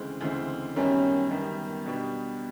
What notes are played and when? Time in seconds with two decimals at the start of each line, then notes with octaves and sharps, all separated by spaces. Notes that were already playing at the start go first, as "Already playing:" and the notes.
Already playing: D2 C#3 E3 G#3 C4
0.21 D2 C#3 E3 G#3 C4
0.76 F#2 D#3 G3 B3 C#4
1.31 F#2 D#3 G3 B3
1.86 B2 G3 B3 D4 G4